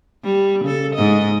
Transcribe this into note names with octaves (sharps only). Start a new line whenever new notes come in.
G3
C#3 A4
G#2 D#5